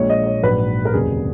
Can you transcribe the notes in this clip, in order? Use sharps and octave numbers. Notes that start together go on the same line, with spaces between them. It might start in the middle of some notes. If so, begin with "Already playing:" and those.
Already playing: A#1 A#2 G#3 C#5
D#5
C#5
A#1 G#2 F#3 B4
A#4
F1 D#2 C#3 F#3 G#4